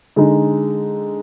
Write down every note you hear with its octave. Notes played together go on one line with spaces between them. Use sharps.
D3 G#3 D#4